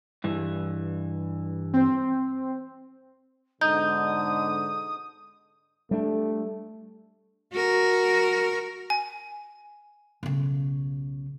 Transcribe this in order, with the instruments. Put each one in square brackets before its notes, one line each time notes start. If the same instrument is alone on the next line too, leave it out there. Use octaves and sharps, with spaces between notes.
[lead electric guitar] G2 E3
[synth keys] C4 C5
[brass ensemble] G#2 B2 D3 [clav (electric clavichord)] D#4 [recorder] D#6 [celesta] G6
[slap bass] G3 D4 [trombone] A3
[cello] F#4 A#4
[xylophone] G#5
[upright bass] B1 C#3